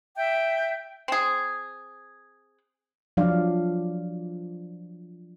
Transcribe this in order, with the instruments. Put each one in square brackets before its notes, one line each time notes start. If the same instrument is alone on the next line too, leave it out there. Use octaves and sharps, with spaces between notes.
[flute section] E5 G5
[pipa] C4 G#4
[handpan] F3 F#3 D4 D5 F5